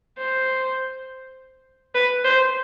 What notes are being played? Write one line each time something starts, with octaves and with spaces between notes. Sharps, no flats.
C5
B4
C5